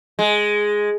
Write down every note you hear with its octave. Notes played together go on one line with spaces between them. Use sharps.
G#3